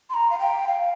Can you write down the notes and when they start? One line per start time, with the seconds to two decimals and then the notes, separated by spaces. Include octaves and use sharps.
0.10 C6
0.14 A#5
0.30 F5
0.39 G5
0.68 F5